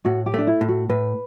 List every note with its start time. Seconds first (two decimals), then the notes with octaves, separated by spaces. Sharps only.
0.05 A2 F#4
0.26 G4
0.34 A3 D4
0.47 E4
0.61 A2
0.68 F#4
0.89 A2 B4